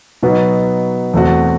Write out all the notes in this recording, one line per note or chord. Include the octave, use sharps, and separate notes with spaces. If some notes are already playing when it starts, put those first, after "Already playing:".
B2 F#3 B3 D#4 F#4
E2 B2 A3 C4 F#4